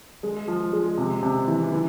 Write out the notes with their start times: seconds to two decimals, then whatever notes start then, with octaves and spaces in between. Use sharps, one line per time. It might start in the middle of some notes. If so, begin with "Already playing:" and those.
0.23 G#3
0.48 F3
0.73 G#3
0.98 C3
1.23 C3
1.48 E3
1.72 E3